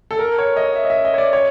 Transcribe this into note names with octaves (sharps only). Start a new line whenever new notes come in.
A4
A#4
C#5
D#5
E5
D#5
E5
D#5
C#5
D5
C#5